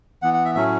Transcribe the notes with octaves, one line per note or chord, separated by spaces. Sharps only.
E3 B3 F#5
F#5
E5
A2 F#3 A3 C#4 E5